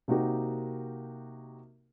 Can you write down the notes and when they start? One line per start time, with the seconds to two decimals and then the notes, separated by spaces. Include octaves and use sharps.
0.08 C3 A#3 D#4 F#4 G4 A#4